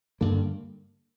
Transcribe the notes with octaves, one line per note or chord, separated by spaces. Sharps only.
G2 D3 A#3